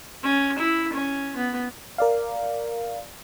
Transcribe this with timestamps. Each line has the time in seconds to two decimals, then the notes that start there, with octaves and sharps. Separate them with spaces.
0.24 C#4
0.58 E4
0.93 C#4
1.36 B3
1.98 A#4 D5 F5